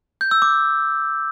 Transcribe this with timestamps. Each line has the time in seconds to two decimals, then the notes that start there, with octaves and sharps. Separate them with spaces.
0.21 G6
0.31 E6
0.42 D6